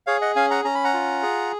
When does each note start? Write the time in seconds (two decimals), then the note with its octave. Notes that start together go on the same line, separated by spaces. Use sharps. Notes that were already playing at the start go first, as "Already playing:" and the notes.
0.07 G#4 C#5 F5
0.21 D#5 F#5
0.36 C#4 F5 G#5
0.51 F#5 A#5
0.65 C#4 A#5
0.75 B5
0.84 F#5 A#5
0.94 F4
1.23 G#4